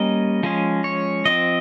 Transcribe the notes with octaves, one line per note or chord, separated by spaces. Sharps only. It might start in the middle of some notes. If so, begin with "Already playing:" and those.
Already playing: G3 A#3 C#4 D#5
F3 G#3 C#4
C#5
F3 C4 D#5